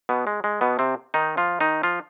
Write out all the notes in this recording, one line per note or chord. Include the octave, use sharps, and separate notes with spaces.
B2 B3
G#3
G#3
B2 B3
C3 C4
D#3 D#4
F3 F4
D#3 D#4
F3 F4